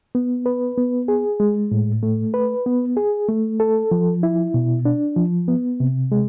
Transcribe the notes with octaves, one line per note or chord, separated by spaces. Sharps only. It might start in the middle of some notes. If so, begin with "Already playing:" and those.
B3
B4
B3
G#4
G#3
A2
A3
B4
B3
G#4
A3
A4
F3
E4
B2
D4
F3
B3
C3
G#3